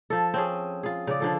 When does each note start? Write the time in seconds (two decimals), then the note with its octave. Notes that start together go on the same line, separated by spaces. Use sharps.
0.10 F3 A4
0.34 C4 C#4 G#4
0.83 F4 G#4
1.07 C#3 D5
1.20 D3 F3 A4